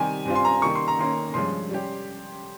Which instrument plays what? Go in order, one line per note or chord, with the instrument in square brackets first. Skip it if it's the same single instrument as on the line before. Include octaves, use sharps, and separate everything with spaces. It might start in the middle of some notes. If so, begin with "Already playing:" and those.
Already playing: [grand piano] D#3 G3 C4 G4 [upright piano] G#5
[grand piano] G2 G3 C4 F4 C5
[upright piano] C6
A#5
[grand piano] D#3 G3 A#3 [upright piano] C#6
[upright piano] C6
A#5
[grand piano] D#3 A#3 C#4 [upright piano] C6
[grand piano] G2 F3 G#3 C#4 [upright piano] C6
[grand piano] G3 C#4 G4